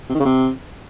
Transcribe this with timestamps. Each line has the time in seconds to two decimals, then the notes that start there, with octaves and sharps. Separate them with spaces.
0.09 C3
0.15 D#3
0.20 C#3
0.25 C3